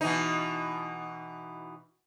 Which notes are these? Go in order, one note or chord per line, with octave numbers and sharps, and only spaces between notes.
B2 E3 D#4